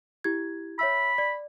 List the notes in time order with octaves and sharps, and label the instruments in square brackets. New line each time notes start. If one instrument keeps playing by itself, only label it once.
[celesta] E4 G4 G#6
[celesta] C#5 E5 E6 [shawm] B5
[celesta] D5